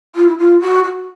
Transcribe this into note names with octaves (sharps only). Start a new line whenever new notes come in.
F4
E4
F4
F#4
F#4